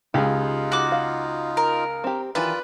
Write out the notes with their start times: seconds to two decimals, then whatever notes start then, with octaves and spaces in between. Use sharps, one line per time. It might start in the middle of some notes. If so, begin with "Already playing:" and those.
0.14 C#2 D#4 F4 G4 G#4
0.72 F#4 D6
0.92 F5
1.57 A#4
2.04 C4 G4
2.35 D#3 E3 F4 B4 D5